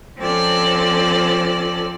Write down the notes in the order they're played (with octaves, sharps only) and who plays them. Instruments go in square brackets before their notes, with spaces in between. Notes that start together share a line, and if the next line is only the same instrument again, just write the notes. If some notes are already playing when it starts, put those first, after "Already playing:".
[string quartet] F3 C4 C#4 F4 A4 D5